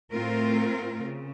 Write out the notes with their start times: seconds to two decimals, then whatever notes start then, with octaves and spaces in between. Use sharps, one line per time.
0.13 A2 A3 C4 F4 A#4
1.03 C#3